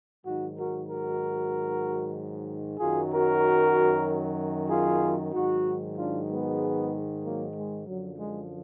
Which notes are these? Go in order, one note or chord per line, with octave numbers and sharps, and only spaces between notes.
G#2 D#3 F#3 D#4 F#4
F#4 A#4
F#4 A#4
F#2 D#3 F#3 F4 G#4
F#4 A#4
F4 G#4
G#2 D#3 F#3 D#4 F#4
D4 F4
G#3 B3
F#3 A#3
G#3
F#2 D3 F3 F#3
G#3